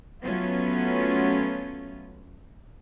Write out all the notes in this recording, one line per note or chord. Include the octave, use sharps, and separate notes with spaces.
F#3 A3 B3 C#4 F4